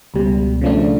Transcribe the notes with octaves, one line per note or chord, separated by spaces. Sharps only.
C#2 B2 G3
C#3 F3 A3 D4